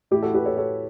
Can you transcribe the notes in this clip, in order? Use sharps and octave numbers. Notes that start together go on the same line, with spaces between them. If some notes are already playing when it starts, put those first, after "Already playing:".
A2 E3 E4 G4
F#4 A4
G4 B4
A4 C#5
A4 C#5